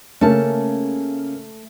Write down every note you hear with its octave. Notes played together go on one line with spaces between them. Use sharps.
C#3 A3 A#3 C#4 A5